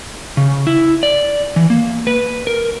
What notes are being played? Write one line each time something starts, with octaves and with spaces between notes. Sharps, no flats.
C#3
E4
D5
E3
A#3
B4
A#4